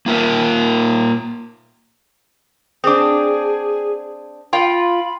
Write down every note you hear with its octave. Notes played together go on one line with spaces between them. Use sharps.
A#3 F4 A#4 E5
C4 D4 G#4 D6 D#6
F4 G5 B5